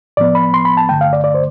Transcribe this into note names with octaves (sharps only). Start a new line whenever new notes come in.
A2 F3 B3 D5
B5
C6
B5
A5
G2 D3 A3 G5
F5
D5
D5
C5